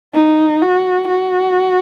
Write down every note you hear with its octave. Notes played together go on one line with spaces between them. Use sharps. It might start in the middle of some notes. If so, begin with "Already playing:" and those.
D#4
F#4
F#4